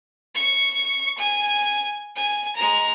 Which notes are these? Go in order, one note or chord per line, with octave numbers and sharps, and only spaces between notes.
C#6
G#5
G#5
G#3 A#5